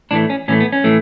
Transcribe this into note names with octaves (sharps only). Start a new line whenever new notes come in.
A2 E3 A3 D4
C#4
A2 E3 A3 C#4
B3
C#4
A2 E3 A3